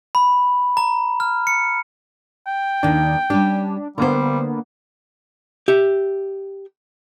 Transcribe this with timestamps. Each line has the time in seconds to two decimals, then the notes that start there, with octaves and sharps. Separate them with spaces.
0.15 B5
0.77 A#5
1.20 F6
1.47 C#7
2.47 G5
2.83 D#2 D#3 D4
3.30 G3 C#4 D4 G4
3.98 D3 G3 A#3 B3 A#4 C5
5.68 G4 E5